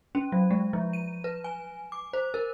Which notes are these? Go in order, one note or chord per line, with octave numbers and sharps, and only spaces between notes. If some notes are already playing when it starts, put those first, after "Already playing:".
C#4
F#3
G#3
F3
D#7
B4
G#5
D6
C5
A#4